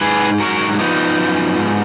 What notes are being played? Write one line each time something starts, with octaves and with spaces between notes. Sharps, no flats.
G#2 G#4 B4
F#3 F#4 A#4
F3 B3 D#4
F#2
G#2